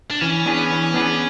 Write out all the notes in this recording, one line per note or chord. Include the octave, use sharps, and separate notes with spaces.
D4
E3 C#4
B3 D4 G#4 B4
E3
B3 D4 G#4 B4